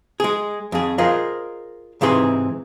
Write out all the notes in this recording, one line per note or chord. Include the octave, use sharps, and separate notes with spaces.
G#3 G#4
F2 G#4
F4 G#4 A#4 C5 D#5
G#2 C3 E3 G#4 C6